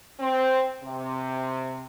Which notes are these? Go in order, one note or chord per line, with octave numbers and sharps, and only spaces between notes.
C4
C3